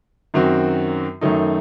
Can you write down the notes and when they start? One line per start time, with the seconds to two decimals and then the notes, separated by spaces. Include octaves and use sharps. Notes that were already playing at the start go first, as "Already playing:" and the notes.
0.34 F#2 D#3 F#3 C4 F#4
1.21 F#2 D#3 F#3 A3 D#4